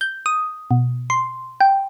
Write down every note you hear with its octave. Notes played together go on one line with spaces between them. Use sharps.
G6
D#6
B2
C6
G5